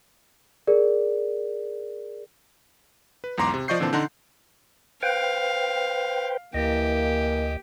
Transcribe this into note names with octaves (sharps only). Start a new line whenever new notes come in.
G#4 A#4 D5
B4
B1 E2 G#2 A#5 C6 D6
C3
F3 D5 D#5 C#6 G6 C7
A#2 D3 E3 C4 A5
D3 D4 D#4 F#5 A#5 C6
B4 C5 F5 G5
D2 E3 A#3 G4 D#5